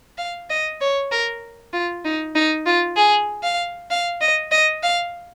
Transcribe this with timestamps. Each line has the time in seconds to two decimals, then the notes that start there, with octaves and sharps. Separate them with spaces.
0.18 F5
0.50 D#5
0.81 C#5
1.12 A#4
1.73 F4
2.05 D#4
2.35 D#4
2.66 F4
2.97 G#4
3.43 F5
3.91 F5
4.21 D#5
4.52 D#5
4.83 F5